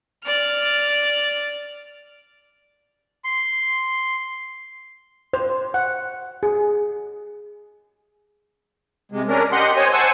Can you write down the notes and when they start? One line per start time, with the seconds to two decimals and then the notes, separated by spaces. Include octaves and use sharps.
0.25 D5 F6
3.24 C6
5.33 C5
5.74 F#5
6.43 G#4
9.12 C3 G#3
9.29 C#4 D4 A#4
9.52 G4 D#5 F#5 C6
9.77 C5 C#5 D#5 G#5
9.93 C5 F#5 G#5 A5 C#6 E6